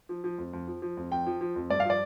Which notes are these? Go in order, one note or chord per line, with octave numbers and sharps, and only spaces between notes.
F3
F3
F2
F2
F3
F3
F2
F2 G5
F3
F3
F2
G2 D5
F5
F3 D5